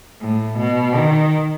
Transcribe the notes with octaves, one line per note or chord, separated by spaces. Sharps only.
A2
B2
D#3